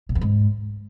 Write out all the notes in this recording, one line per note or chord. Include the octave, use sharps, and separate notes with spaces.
A#2
E2
G#2